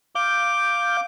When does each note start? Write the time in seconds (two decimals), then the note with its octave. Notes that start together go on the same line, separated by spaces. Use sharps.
0.15 F5 D6 G6